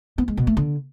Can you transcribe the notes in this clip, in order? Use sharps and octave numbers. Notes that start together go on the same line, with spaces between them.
B3
G#3
B2
A3
D3